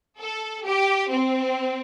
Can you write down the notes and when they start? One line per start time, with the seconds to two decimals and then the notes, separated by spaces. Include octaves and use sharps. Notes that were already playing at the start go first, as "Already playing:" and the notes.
0.18 A4
0.65 G4
1.09 C4